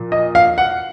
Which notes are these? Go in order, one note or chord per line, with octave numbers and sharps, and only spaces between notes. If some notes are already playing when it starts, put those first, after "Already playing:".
Already playing: A#2 F3
D#5
F5
F#5